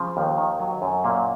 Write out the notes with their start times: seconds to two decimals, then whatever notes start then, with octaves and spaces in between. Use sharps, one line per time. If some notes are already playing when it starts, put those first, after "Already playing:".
Already playing: C#3 F3
0.17 D#2
0.38 D#3
0.60 F#3
0.82 F#2
1.04 A#2 A#3